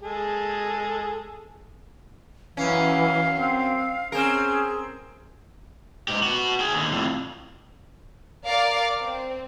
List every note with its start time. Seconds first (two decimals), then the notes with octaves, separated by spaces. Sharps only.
0.02 G#3 G#4 A4
2.57 F#2 E3 C#4 F5
3.38 C4
4.12 C4 C#4 G#4 A#4
6.08 G#2 G4
6.23 B3 F#4
6.60 G#4 G5
6.73 D#2 D3
6.92 F2 A2
8.45 A#4 D5 F5 D6 A6
9.03 C4